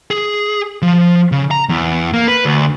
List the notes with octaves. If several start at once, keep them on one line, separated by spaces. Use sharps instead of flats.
G#4
F3
C#3
A#5
E2
A#3
B4
D2